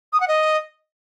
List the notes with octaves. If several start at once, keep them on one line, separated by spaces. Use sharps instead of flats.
D#6
F#5
D#5